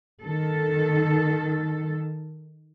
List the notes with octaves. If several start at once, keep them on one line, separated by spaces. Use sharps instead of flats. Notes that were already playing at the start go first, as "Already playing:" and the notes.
D#3 A4